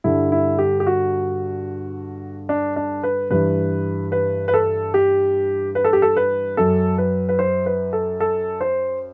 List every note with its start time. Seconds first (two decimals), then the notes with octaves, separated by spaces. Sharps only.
0.04 G2 D3 G3 E4
0.32 E4
0.59 G4
0.80 G4
0.87 F#4
2.49 D4
2.76 D4
3.03 B4
3.31 G2 E3 G3 B4
4.12 B4
4.48 B4
4.54 A4
4.94 G4
5.75 B4
5.84 A4
5.93 G4
6.02 A4
6.17 B4
6.57 F#2 F#3 A4
6.98 B4
7.29 B4
7.39 C5
7.66 B4
7.93 A4
8.20 A4
8.61 C5